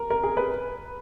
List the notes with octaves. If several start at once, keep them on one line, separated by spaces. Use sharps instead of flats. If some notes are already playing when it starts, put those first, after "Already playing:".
Already playing: A#4
A#4
G#4
B4